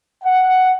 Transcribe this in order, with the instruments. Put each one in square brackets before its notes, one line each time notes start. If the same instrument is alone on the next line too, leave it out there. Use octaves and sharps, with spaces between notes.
[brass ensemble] F#5